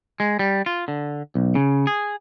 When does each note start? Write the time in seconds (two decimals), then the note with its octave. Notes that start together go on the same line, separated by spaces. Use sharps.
0.20 G#3
0.39 G3
0.66 F4
0.88 D3
1.35 B1
1.55 C#3
1.87 G#4